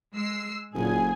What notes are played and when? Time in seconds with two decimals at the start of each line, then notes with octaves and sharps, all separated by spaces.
0.14 G#3 E6 C7
0.74 F#1 A#2 D3 G#4 G#5